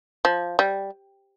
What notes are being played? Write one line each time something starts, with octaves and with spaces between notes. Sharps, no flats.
F3
G3